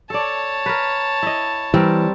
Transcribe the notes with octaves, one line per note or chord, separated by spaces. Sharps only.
A4 C#5 D5 A5
A#4 B4
E4 D#5
E3 G3 C4 A#4